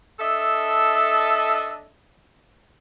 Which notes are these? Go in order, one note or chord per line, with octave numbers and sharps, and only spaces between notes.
D4 A4 D#5 E5